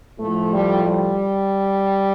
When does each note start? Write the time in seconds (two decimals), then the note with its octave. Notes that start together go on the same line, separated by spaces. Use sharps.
0.19 A2 F3 A3
0.51 G3
0.83 G3